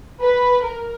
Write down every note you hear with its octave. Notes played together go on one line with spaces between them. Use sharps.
B4
A#4